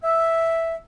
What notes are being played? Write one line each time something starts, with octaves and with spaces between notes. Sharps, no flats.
E5